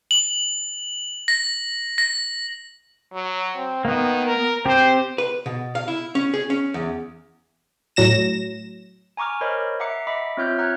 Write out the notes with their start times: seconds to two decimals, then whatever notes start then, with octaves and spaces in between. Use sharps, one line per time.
0.11 F#7
1.28 A#6
1.98 A#6
3.12 F#3
3.56 C4
3.85 D#3 A#3 B3
4.26 A#4
4.66 C4 G4 C5
5.18 B4
5.46 B2
5.75 F5
5.88 E4
6.15 C#4
6.34 G#4
6.50 C#4
6.74 E2
7.96 A2 F#3 A#6 E7
9.17 G#5 A#5 C#6 D6 F6
9.41 A#4 C5 C#5 D#5 B5
9.80 E5 F#5 A#5 D6 C7 C#7
10.07 D#5 E5 B5 D6 B6
10.37 C4 F4 C#5 E5 F6 G6
10.58 F#5 A#5 F6 F#6 G#6